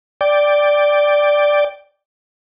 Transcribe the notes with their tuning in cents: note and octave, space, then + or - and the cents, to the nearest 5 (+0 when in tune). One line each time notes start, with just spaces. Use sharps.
D5 +0 G5 +5